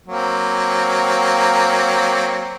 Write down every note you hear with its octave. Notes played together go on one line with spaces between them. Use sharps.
F#3 A#3 C4